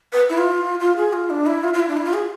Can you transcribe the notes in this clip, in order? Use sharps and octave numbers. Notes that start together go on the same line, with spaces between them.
B4
E4
F4
F4
G#4
F4
D4
E4
F4
F4
E4
D4
E4
F4
G#4